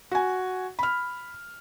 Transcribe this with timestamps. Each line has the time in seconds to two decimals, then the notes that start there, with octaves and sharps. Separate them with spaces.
0.11 F#4 G#5
0.79 B5 F6